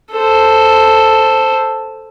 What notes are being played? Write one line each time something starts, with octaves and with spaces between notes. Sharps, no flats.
A4 C5